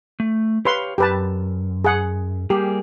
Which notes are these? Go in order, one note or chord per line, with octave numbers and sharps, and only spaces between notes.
A3
G4 B4 C#5 F5 C6
F#2 G4 B4 A5
G#4 F#5
G3 A#3 G4 G#4